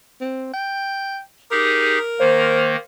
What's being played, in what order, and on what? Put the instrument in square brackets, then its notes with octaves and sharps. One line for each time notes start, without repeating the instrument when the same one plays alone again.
[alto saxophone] C4
G5
[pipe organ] D#4 G4 G#4 [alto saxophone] A#4
[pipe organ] D#3 A#3 [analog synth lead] C5